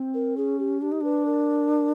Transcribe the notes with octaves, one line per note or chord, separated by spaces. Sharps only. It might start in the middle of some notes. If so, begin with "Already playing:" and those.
Already playing: C4
A#4
C#4 G#4
G4
D4 G4
D#4
D4 B4
A#4